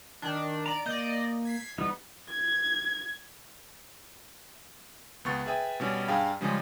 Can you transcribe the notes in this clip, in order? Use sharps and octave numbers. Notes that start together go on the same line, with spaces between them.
D#3 D4
D5 A#5 D7
A#3 D5 D#5 G6
G#6 B6 C7
E3 G3 B3 D#4
G#6
C#2 B3 C#6 A6
G#4 B4 E5 G5
B2 G3 C#4
G2 G#4 F5 G5 B5
C#3 F3 G3 G#3 C#4